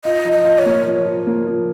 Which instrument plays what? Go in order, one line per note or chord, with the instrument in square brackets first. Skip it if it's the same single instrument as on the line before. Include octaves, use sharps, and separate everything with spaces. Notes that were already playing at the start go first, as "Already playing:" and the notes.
[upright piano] F4 [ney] D#5
[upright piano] F3
[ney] D#5
[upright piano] F4
[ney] C#5
[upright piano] A#3
F3
F3
A#3
F3